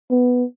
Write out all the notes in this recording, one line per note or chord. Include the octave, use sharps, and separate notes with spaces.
B3